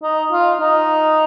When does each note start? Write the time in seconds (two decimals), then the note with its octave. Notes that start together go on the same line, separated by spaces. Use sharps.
0.03 D#4
0.32 F4
0.60 D#4